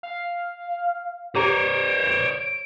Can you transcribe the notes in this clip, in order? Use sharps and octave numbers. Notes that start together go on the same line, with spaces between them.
F5
G4 C5 C#5 A#5 D7